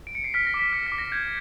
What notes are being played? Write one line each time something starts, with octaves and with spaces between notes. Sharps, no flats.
D7
C#7
C7
F6 B6
A#6
D6
B6
F6 C#7
B6
D6
A#6
G6 G#6